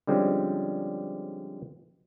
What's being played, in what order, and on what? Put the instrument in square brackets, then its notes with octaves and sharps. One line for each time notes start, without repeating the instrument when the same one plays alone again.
[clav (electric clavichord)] D3 F3 G3 G#3 C4 C#4